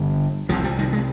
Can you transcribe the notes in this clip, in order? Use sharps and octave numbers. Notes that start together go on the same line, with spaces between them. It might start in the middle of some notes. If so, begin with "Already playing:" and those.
Already playing: G1 G2 D3
C2 C3 F3
G3
D#3
G#3